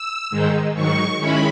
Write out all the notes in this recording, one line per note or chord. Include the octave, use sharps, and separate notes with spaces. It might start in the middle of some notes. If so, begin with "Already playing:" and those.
Already playing: E6
G#2 D#3 G#3 D#4
G#2 D#3 F#3 C#6
D#3 G#3 C#4 E4 B5